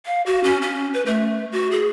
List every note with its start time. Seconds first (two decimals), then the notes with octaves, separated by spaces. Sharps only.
0.06 F5
0.26 F#4
0.44 C#4
0.62 C#4
0.94 B4
1.06 A3
1.52 F#4
1.71 G#4